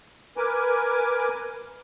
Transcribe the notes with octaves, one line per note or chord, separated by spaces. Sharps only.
A#4 B4 G#5 D6